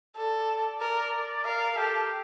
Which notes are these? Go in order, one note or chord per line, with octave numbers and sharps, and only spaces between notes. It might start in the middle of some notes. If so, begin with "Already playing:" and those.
A4 D5
A#4
A#4 F5
G4 A4